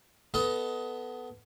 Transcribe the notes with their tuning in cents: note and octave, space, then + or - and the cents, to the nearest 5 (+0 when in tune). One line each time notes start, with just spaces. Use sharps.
B3 +5 A4 +0 D#5 +20